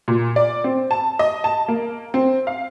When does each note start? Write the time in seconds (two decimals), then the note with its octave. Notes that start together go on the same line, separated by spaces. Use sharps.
0.08 A#2
0.36 D5
0.64 C4
0.91 A5
1.19 D#5
1.44 A5
1.68 A#3
2.14 C4
2.47 F5